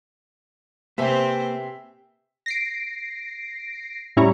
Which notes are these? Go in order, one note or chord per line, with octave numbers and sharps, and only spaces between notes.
C3 A#3 C4 G4 B4 C5 E5 G#5
A#6 C7 D7
A2 G3 C#4 E4 A#5 C#6